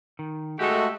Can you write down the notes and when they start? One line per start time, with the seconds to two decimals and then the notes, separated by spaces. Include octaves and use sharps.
0.19 D#3
0.59 G#3 A3 F#4 G4 A4